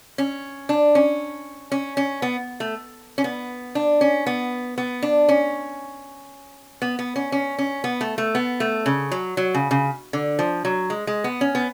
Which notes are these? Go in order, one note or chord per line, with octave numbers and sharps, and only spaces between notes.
C#4
D4
C#4
C#4
C#4
B3
A3
C#4
B3
D4
C#4
B3
B3
D4
C#4
B3
B3
C#4
C#4
C#4
B3
A3
A3
B3
A3
C#3
F#3
F#3
C#3
C#3
D3
F3
F#3
G#3
G#3
B3
C#4
B3